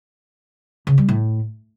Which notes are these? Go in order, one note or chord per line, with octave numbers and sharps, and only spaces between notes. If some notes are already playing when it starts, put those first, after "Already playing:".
C#3
G3
A2